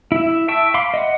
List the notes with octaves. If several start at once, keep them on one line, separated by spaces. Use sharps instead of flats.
E4 E5
E5 G5 A5 C#6 E6
F5 B5 C6 D6
D#5 E5 F#5